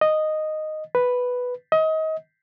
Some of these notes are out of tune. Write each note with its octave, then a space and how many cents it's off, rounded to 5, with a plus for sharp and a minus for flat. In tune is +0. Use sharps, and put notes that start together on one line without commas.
D#5 -5
B4 +0
D#5 +30